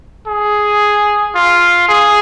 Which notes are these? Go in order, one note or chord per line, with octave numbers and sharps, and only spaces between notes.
G#4
F4
G#4